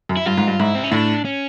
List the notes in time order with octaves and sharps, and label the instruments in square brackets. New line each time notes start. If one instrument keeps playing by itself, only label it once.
[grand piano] F#2
[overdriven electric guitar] E4
[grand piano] G2 [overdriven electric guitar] F4
[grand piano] G#2
G2
[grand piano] G#2 [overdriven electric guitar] E4
[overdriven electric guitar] C4
C#4
[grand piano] A2 [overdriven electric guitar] D4
[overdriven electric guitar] C#4